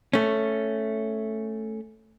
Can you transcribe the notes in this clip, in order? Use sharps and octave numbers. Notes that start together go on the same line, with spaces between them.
A3 C#4